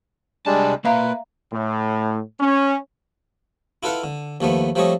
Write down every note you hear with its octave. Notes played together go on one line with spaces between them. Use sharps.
C2 G3 G#3 D4 A5
A#3 B4 D5 E5 F5 A#5
A2
C#4
E4 F4 A4 B4 F5 F#5
D3
D#2 F3 A3 B3
F3 G3 A3 C4 C#5 D#5